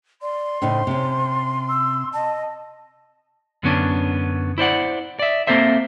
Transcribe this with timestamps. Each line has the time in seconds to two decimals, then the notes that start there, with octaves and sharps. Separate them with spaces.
0.22 D5 C6
0.62 A2 C#3 D#4 C5
0.87 C3 C#4
1.69 E6
2.13 D#5 A5
3.63 F#2 D3 B3 C#4 D4
4.58 E4 C5 D5 F#5
5.19 D5 E5
5.47 A#3 C4 A4 C5 E5